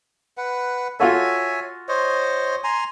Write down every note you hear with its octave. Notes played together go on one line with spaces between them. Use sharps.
B4 F#5
F4 F#4 A4 C#5 E5 G#5
C5 C#5 D#5
G#5 A#5 C6